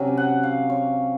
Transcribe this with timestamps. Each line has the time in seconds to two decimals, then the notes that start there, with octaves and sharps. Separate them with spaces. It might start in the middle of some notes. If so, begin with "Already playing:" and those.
Already playing: C3 F#3 C#4
0.17 F#5
0.43 F5
0.70 C#5